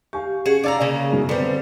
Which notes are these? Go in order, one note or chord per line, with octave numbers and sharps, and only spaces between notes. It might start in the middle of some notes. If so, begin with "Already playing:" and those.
G4 F5 G#5 C#6
C#4 G#4 F#5
C#4 D5 F5 A5 A#5 E6
C#3 A#3
F#2 B2
D3 G3 B3 C4 B4 C5